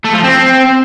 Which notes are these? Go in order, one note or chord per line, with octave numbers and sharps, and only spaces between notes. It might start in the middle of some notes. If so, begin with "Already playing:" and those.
A3
F3
C4